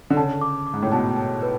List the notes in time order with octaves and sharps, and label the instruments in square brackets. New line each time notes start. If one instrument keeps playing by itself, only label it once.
[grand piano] D3
[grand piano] C#3 [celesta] A5
[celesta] D6
D6
[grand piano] G#2
A2
[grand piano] B2 [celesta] A5
[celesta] A5
B4